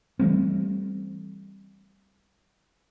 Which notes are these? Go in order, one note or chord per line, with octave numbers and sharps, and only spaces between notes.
E3 G3 A3 C4